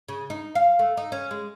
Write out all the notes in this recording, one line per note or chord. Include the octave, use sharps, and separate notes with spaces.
C#3
D#4
F5
A3
D#4
C#4
G#3